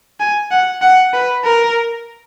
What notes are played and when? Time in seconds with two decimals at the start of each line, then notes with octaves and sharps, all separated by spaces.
0.20 G#5
0.51 F#5
0.82 F#5
1.13 B4
1.44 A#4